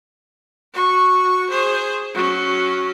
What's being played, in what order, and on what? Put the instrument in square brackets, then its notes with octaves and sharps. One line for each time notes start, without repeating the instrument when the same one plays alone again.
[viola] F#4 C#6
G#4 C5
F#3 C#4